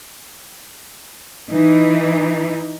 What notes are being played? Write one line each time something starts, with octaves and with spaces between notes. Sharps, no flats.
E3 D#4